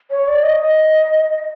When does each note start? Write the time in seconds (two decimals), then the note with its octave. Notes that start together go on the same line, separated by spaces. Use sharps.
0.11 C#5
0.28 D5
0.43 D#5
0.60 D#5